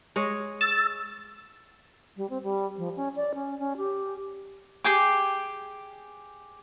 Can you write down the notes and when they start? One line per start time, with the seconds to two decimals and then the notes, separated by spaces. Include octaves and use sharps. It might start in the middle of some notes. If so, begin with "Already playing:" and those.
0.16 G#3 C#5 D#5
0.61 E6 A6
2.17 G3
2.30 C4
2.43 G3
2.78 F3
2.96 C#4
3.16 D5
3.35 C#4
3.59 C#4
3.77 G4
4.84 G4 G#4 G5 D6